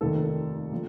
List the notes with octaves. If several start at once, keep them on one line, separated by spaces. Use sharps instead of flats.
F1 D#2 D#3 A#3 A4
D3 F3 A#3